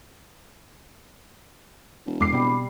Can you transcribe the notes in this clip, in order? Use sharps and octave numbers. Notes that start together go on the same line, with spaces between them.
E1
E2 G#3 D6 C7
B2 G3 B3 C4